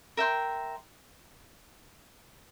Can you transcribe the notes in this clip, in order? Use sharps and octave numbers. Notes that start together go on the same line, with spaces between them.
A#4 E5 G5 C6